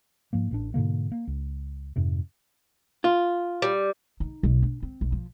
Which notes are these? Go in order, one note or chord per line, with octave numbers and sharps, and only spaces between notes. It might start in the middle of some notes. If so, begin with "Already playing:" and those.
G#2 F3 A#3
A1 A2 D4
G#2 B2 D3 A#3
A#3
C#2
F2 G#2 C3
F4
G3
D#4
B1
D4
C4
B1
F3